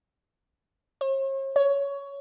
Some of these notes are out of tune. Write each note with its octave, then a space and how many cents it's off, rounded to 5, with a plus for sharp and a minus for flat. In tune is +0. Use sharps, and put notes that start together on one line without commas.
C#5 -45
C#5 +15